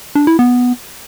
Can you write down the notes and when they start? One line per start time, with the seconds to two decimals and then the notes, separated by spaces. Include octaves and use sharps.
0.15 D4
0.27 E4
0.39 B3